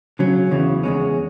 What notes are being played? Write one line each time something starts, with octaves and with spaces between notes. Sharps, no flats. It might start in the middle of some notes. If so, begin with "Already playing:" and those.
C#3 F#3 C#4
E2 C#3 E3
E2 C#3 G#3 C#4